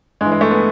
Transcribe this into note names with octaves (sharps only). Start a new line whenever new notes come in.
G2 E3 G#3
G#3
A3
B3